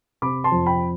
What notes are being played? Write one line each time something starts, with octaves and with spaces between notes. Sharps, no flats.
C3 B5 D6
A5 C6
F2
G5 B5